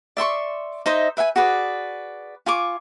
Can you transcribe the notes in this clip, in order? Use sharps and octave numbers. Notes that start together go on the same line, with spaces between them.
D5 E5 C6 C#6
D#4 C5 D#5 E5
B4 E5 F#5 G#5
F#4 G#4 B4 D5
F4 G#5 C#6 D6